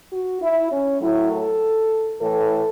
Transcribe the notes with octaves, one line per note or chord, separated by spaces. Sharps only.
F#4
E4
C#4
A2 F#3 E4
A4
A2 E3 A4